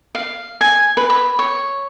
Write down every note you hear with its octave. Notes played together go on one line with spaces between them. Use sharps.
F5
G#5
B4
B5
C#5